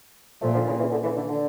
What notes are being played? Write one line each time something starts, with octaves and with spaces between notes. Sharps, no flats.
A#2 F3 A3
D3 F3
C#3 E3
C#3 E3
D3
C#3 E3
D3
D3